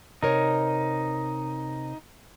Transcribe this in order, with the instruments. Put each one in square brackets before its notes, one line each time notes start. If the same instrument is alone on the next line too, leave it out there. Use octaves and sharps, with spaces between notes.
[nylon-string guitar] C3 A#4 C#5 [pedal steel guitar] D#4